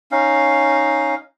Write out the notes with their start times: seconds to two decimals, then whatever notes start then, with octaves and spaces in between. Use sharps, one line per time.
0.11 C#4 D#4 F5